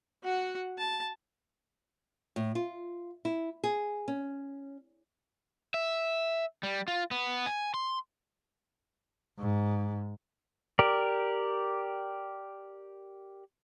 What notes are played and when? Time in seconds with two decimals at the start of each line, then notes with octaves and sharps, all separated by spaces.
0.23 F#4 F#5
0.78 A5
2.36 A2
2.55 F4
3.25 E4
3.64 G#4
4.08 C#4
5.74 E5
6.63 G3
6.88 F4
7.11 B3
7.46 G#5
7.74 C6
9.40 G#2
10.79 G4 A#4 D5